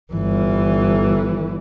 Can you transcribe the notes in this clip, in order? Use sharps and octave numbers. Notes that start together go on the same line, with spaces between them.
G1 E3